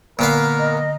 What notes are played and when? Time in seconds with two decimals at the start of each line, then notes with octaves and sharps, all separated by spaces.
0.19 A#2 D3 B3 A#4 F5
0.59 D#5